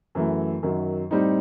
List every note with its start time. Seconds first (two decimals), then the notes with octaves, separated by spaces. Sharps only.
0.15 F#2 E3 A3
0.63 F#2 D#3 F#3
1.11 A2 G3 C4 D#4